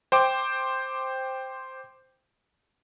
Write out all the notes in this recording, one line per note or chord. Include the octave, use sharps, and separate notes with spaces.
C5 G5 D6